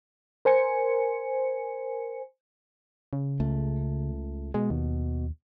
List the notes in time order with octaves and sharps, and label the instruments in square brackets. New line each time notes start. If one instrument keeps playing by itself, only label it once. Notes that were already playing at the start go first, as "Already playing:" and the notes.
[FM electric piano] A#4 C5 G#5 C#7
[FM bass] C#3
[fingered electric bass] C#2 A3
[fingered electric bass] B2 [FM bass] G#3
[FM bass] D#2